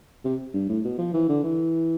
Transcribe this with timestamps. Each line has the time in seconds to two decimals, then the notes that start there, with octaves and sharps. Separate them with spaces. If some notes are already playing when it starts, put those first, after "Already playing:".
0.25 C3
0.54 G2
0.68 A2
0.84 B2
0.98 F3
1.14 E3
1.29 D3
1.43 E3